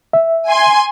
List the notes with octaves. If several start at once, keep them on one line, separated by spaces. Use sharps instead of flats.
E5
G#5 C6